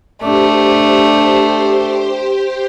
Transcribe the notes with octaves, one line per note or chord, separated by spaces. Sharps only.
A3 D4 G4 C5